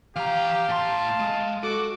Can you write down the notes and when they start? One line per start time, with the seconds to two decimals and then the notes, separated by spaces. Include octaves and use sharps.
0.16 E3 G4 F5 A#5
0.69 A2 A5 C6
1.20 G#3
1.63 F#4 A4 D6